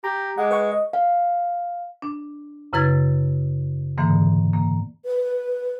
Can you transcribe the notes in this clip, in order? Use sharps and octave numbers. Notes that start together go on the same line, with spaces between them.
G4 A#5
G#3 F#5 D6
B4 F#5 C#6
D#5
F5
D4
F#2 C#3 E4 B4 G#6 A6
G#2 D3 E3 A#3
A#3
B4